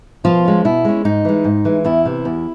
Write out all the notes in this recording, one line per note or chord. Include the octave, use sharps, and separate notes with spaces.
B2 F3 F4
G#3 C#4
B2 E4
G#3 C#4
G#2 D#4
E3 G#3
G#2
E3 G#3
E2 E4
C3 E3
E2